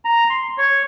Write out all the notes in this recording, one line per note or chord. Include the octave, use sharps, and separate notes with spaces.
A#5
C6
C#5